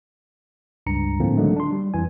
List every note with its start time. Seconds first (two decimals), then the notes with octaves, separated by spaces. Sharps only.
0.87 C#2 G2 A#5 C#7
1.20 A2 D3 F3 A#3 C4
1.37 D3 D#3 F#3 G#3 A3 D#4
1.56 D4 C6
1.72 G3
1.94 F2 E3 G#5